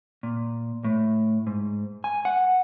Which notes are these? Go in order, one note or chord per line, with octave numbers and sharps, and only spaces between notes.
A#2
A2
G#2
G#5
F#5